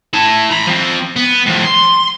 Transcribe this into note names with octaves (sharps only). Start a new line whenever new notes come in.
E4 A5
A#5 B5
F3 C4
B3
A2 F3
C6